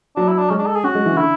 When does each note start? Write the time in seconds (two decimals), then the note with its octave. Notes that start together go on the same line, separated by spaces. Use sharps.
0.16 F#3 D4
0.28 E4
0.38 D4
0.49 G#3 C#4
0.59 D4
0.67 A4
0.76 G#4
0.83 C#4 F#4
0.95 G#3
1.06 E3
1.11 C#3
1.17 D3 E4